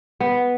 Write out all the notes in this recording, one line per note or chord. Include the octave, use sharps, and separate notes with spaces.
B3